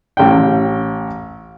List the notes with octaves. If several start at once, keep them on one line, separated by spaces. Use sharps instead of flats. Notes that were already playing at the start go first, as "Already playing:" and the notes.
A1 G5